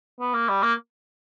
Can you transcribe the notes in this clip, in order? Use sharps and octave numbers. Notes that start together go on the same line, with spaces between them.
B3
A#3
G3
A#3